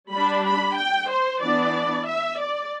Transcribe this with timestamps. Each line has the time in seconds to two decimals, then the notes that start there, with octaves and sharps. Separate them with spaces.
0.12 G3 D4 B5
0.45 B5
0.77 G5
1.10 C5
1.42 E3 B3 D4 D5
2.07 E5
2.40 D5